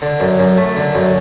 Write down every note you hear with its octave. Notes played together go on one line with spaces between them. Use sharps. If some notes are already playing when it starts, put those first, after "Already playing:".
D3
F#2
F#2
A3
D3
F#2